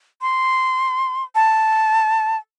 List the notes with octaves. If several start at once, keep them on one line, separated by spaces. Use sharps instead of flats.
C6
A5